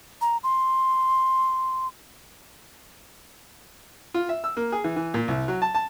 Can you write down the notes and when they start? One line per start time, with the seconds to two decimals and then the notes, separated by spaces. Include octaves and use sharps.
0.21 A#5
0.43 C6
4.14 F4
4.29 E5
4.44 E6
4.57 A#3
4.72 G#4
4.84 E3
4.96 E3
5.14 A#2
5.28 C2
5.48 F#3
5.62 A5
5.75 A5